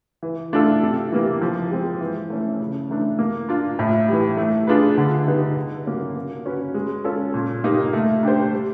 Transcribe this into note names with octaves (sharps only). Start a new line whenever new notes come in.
E3
A3 D4 F4 A4
C3
E3 G3 A#3
F3
G#3 C4
E3
A3 C#4
C#3
E3 A3 D4
A#3
D4 F4
A2
E3 G3
A3
D4 F4 G#4 B4
D3
G3 B3 D#4
D3
F#3 A#3 C#4
A#3
C#4 F#4 B4
G#3
C#4 F4 A4
A#2
G3 A#3 D#4
A3
D4 G4 C5
G3